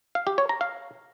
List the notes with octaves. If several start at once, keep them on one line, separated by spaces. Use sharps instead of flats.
F5
G4
C#5
A#5
F5